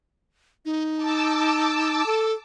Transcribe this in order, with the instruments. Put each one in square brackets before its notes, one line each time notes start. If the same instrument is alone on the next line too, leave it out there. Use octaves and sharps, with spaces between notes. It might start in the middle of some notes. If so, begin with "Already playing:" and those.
[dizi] D#4
[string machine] A5 D6 E6
[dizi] A4